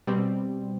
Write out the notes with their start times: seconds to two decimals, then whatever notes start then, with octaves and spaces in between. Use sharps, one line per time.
0.07 B2 G3 C4